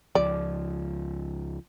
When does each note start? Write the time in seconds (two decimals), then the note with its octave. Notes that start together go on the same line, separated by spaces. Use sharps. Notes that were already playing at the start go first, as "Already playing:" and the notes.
0.15 C#2 F3 D5